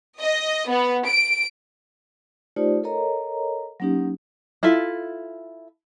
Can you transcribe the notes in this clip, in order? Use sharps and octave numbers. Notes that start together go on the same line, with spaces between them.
D#5
B3
D7
A3 D#4 F4 G4 C5 D5
A4 A#4 C#5 D#5 A#5
F#3 A#3 C#4 D#4 G4
E4 F4 A4 E5